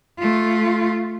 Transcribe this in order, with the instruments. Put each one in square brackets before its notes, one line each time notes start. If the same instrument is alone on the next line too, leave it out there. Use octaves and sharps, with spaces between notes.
[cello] A3 F4